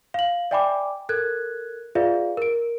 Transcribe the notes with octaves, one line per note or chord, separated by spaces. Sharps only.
F5 F#7
D5 E5 G5 G#5 B5 D6
A4 A#4 F#6 G#6
F4 G#4 B4 D5 E5 F5
A#4 D7